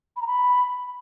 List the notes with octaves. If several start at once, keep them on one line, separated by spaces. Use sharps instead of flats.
B5
A#5
B5